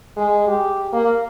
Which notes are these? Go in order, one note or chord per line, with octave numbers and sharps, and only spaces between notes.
G#3
G4
A#3